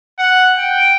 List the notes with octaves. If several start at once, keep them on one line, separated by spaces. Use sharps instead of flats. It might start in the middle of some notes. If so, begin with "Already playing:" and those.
F#5
G5